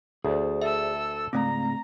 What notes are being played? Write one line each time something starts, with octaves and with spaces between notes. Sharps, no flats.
D2 G#4 C5 D5
A4 E5 E6
C#2 G#2 A3 C4 A#5